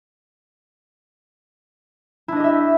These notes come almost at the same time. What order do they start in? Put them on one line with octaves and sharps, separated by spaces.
E4 D4 D#5 G4 E5